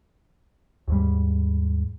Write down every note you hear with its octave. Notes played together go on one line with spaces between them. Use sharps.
D#2 G#2 G3